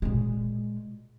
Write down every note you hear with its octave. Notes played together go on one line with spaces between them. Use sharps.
A#2 G#3